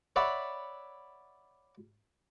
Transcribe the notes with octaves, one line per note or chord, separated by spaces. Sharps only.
C#5 D5 E5 F#5 B5